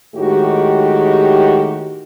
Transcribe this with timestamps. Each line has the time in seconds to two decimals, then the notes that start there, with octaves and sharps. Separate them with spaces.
0.15 A2 D#3 G#3 F#4 G4